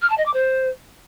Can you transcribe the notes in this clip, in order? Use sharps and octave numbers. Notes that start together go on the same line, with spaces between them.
F6
A5
D#5
D6
C5